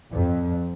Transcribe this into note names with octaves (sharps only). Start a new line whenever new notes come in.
F2